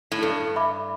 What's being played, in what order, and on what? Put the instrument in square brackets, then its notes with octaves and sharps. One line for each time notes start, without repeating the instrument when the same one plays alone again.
[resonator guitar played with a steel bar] A2
[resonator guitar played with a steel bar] G2 [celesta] A4
[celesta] E5 B5 D6